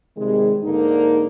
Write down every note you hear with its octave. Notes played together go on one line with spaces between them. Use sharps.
C3 D#3 G3 G#3
G#2 D3 A#3 D4 D#4